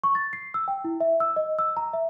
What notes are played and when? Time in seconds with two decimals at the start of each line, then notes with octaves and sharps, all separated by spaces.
0.04 C#6
0.15 A6
0.33 C7
0.54 E6
0.68 G5
0.85 E4
1.00 E5
1.20 E6
1.36 D#5
1.59 E6
1.77 A#5
1.93 E5